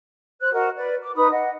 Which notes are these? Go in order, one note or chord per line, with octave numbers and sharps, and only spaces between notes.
C5 F#6
F#4 A#4 D#5
B4 D5
D6
D#4 B4 B5 D#6
D#5 F#5